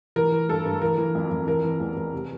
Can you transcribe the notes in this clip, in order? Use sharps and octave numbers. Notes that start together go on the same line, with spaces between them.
E3 A#4
E3
G2 A4
G2
E3 A#4
E3
F2
F2
E3 A#4
E3
E2
E2
C3